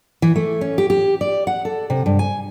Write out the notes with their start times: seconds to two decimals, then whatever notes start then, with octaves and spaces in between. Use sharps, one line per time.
0.22 E3
0.36 A3
0.61 C#4
0.78 G4
0.90 G4
1.21 D5
1.47 F#5
1.65 A4
1.90 C3
2.06 G2
2.19 G#5